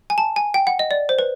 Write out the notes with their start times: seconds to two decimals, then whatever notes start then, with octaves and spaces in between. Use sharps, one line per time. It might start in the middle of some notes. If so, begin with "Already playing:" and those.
0.10 G#5
0.18 A5
0.36 G#5
0.54 G5
0.67 F#5
0.79 D#5
0.91 D5
1.09 C5
1.19 B4